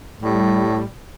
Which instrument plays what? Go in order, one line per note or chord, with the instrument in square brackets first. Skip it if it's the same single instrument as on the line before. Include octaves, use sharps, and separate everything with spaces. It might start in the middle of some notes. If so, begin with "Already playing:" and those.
[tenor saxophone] A2 [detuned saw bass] G3